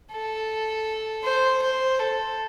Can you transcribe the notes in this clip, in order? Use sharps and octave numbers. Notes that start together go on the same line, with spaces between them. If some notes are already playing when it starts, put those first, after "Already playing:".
A4
C5
C5
A4